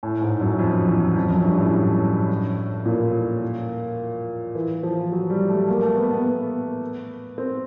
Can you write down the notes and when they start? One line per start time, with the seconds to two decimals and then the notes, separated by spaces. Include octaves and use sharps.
0.03 A2
0.22 G#2
0.41 F#2
0.59 F2
0.88 E2
1.16 F2
1.30 F#2
1.44 G2
1.58 A2
2.86 A#2
4.55 E3
4.83 F3
5.12 F#3
5.30 G3
5.49 A3
5.68 A#3
5.82 A3
5.96 B3
6.11 B3
6.24 B3
7.38 C4